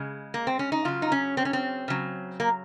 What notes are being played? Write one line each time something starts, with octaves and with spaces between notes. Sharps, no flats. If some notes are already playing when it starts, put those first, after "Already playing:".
Already playing: C#3 G#3
A#3
C4
C#4
D#4
C#3 F#3 F4
D#4
C#4
C4
C#4
C4
C#3 F#3
A#3